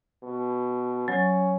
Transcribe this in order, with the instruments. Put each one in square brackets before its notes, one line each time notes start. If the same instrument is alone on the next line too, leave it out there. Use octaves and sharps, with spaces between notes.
[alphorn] B2
[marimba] F#3 [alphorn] C#4